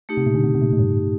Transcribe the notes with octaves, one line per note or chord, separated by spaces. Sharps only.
A3 D#4 G4
C3
A#2
D3
C3
C3
A#2
A2
G2